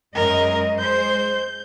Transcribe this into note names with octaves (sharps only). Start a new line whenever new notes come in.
F#2 G#3 A#4 D#5
G#3 C5 G6